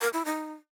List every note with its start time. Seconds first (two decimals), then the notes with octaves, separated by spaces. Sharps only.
0.01 A#4
0.13 E4
0.25 D#4